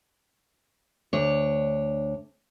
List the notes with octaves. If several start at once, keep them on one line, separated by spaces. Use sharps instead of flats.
D2 D4 C#5